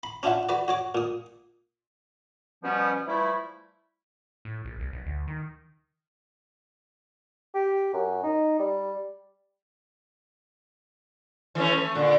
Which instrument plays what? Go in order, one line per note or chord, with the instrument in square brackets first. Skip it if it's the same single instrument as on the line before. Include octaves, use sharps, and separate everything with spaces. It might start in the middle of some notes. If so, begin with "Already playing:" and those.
[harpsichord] B5
C#4 D4 E4 F4 E5 F#5
F#4 B4 D5
F#4 C#5 D6
A#2 D#6
[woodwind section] G2 B2 F3 G3 B3 C#4
E3 F3 G3 A3 E4
[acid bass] A2
A#1
C2
B1
D2
D#3
[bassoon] G4
F#2
D#4
G3
[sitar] E3 A3 C#4
A3
A#2 D3